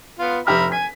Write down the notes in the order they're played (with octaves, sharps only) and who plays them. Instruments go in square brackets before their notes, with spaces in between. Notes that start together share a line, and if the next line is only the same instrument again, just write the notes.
[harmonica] B3 F4
[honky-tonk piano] F1 G4 F6 [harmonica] E5 A#5 B5
[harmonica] G#5 [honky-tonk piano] B6